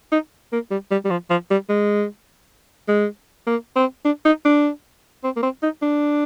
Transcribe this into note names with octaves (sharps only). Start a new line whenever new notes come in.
D#4
A#3
G3
G3
G3
F3
F3
G3
G#3
G#3
A#3
C4
D4
D#4
D4
C4
A#3
C4
D#4
D4